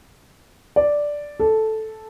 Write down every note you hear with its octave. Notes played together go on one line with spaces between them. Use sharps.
D5
A4